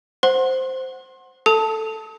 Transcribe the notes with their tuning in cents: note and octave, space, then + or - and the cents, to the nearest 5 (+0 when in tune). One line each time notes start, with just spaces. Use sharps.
C5 +0 F#5 +0 C6 +30
A4 +0 A5 +0 D#6 +45